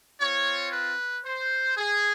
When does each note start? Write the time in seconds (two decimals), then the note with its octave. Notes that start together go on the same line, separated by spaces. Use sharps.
0.20 C4 F4 C#5
0.72 B4
1.25 C5
1.77 G#4